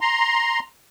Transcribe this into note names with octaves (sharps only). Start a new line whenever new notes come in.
A#5 C6